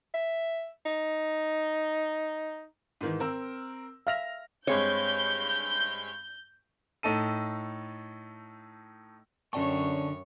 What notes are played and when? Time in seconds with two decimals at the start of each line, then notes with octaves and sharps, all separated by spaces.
0.14 E5
0.85 D#4
3.01 G#2 D#3 E3
3.20 C4 A#4 E6
4.07 E5 F5 F6 A#6 F7
4.67 G2 G#3 C4 C#5 G6
7.03 A2 D#4 A4 D#7
9.53 F#2 D3 C#4 C#5 D5 G5 A5 C#6